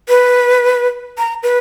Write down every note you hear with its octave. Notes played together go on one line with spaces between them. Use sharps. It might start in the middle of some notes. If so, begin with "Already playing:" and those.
B4
A#5
B4